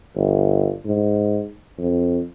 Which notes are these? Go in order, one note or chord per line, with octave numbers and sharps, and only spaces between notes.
G1
G#2
F2